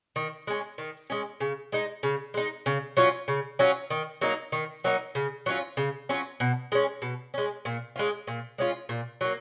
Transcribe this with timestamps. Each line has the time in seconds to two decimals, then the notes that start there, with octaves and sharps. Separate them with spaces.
0.16 D#3
0.47 G#3 C#4
0.78 D#3
1.10 G#3 C#4
1.40 C#3
1.72 G#3 D#4
2.03 C#3
2.34 G#3 D#4
2.66 C#3
2.97 F#3 C#4 F4
3.28 C#3
3.59 F#3 C#4 F4
3.90 D#3
4.21 F#3 A#3 D#4
4.52 D#3
4.84 F#3 A#3 D#4
5.15 C#3
5.46 F#3 C#4 F4
5.77 C#3
6.09 F#3 C#4 F4
6.40 B2
6.72 G#3 C#4
7.02 B2
7.34 G#3 C#4
7.65 A#2
7.96 G#3 C#4 F4
8.27 A#2
8.58 G#3 C#4 F4
8.89 A#2
9.21 F#3 A#3